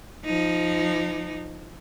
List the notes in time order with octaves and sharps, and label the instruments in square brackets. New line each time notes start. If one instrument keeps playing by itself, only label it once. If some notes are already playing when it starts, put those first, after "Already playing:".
[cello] F3 D#4